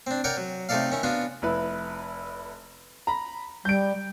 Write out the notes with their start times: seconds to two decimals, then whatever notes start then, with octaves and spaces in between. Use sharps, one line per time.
0.07 C4 D4
0.24 A#4 C#5 D5 F#5 G5
0.37 F#3
0.69 C3 A3 D#4 A4 D5 F5
0.91 D#3 C#4 E4
1.03 B3 D4 F4 F#4
1.42 F1 E4 B4
3.07 A#5 B5
3.65 G3 G6 D7